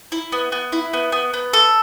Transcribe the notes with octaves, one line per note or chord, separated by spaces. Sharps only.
E4
B3
B3
E4
B3
B3
B3
A4